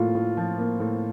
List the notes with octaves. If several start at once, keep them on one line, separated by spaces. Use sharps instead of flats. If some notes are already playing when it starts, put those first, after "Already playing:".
Already playing: A2 F3 A#3 F4
A2
F3
A#3
A2